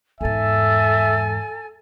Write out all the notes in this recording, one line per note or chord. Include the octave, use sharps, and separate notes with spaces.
E2 G#2 A4 E5 G#5